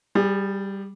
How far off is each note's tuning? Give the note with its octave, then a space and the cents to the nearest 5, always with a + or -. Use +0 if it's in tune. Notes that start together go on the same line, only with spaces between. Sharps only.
G3 +0 G#4 -30